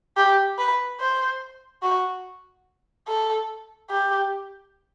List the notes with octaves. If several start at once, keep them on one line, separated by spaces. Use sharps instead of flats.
G4
B4
C5
F#4
A4
G4